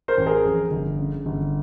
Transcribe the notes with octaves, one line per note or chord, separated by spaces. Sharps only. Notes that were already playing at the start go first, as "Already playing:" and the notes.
A#4 C5
A1
G#4 A#4
F2
G1
C#3
G1